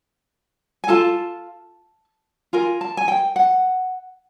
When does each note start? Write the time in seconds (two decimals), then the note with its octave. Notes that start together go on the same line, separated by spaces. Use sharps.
0.84 G#5
0.88 F4 A4 A5
2.53 F4 A#4 G#5
2.81 A5
2.97 G#5
3.08 G5
3.36 F#5